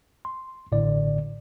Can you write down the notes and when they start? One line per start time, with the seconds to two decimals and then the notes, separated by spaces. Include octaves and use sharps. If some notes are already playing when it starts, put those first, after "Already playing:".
0.25 C6
0.72 A1 A2 D3 D5